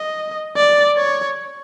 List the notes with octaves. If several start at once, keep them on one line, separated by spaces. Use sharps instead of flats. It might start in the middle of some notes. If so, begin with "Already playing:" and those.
Already playing: D#5
D5
C#5